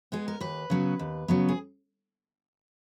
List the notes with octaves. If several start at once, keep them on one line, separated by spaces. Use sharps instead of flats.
G#3 B3 G#4
A#4
D#2 B4
C#3 F#3 B3
D#2
C#3 F#3 B3
G#4